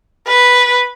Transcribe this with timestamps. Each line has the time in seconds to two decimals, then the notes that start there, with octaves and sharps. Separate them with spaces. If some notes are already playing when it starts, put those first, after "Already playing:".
0.28 B4